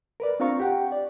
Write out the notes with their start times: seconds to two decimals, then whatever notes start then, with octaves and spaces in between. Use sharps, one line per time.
0.20 A#4 B4 D5
0.40 C4 D4 F4 F5 A#5 C#6
0.60 G4 F#5 G5
0.92 D5